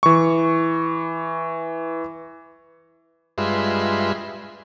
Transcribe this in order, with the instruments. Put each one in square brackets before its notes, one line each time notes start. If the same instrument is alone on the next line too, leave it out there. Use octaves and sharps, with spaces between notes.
[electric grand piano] E3 C#6
[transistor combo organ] G2 G#3 F4 B4 E5 C6